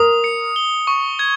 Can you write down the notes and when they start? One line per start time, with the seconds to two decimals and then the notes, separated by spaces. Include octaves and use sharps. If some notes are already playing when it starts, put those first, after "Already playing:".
Already playing: A#4 D#6
0.24 C#7
0.56 G7
0.87 C#6
1.19 G#6